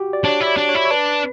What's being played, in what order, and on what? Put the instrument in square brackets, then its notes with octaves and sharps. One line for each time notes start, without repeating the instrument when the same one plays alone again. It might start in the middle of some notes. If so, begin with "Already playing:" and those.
Already playing: [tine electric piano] F#4 G4
D5
[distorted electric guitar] D4 [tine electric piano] C#5
[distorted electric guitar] E4
[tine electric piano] D5
[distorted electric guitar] D4
[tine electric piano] C#5
[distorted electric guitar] E4
[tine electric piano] C#5
[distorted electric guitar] D4 [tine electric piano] B4